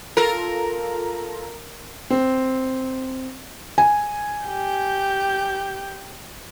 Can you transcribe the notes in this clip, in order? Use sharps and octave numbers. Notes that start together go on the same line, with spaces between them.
F4 A4 A#4 A#5
C4
G#5
G4 G6